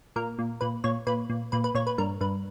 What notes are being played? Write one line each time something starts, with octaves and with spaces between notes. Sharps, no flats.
A#2 A#4
A#2
A#2 B4
A#2 C#5
A#2 B4
A#2
A#2 B4
B4
A#2 C#5
B4
G2 A#4
G2 B4